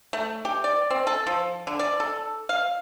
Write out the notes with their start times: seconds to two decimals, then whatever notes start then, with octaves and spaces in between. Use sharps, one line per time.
0.13 A3
0.45 G4
0.64 D5
0.90 C4
1.07 A4
1.27 F3
1.67 D3
1.79 D5
2.00 A4
2.49 F5